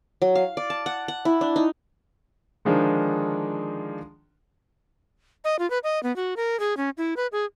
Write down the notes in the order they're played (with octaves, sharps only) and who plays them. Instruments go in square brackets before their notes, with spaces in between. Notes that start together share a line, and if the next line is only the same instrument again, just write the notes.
[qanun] F#3
F5
D5
A5
F#5
F#5
E4
D4
D#4
[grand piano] D3 D#3 F3 G#3 D4 D#4
[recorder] D#5
F4
B4
D#5
B3
F#4
A#4
G#4
C#4
E4
B4
G#4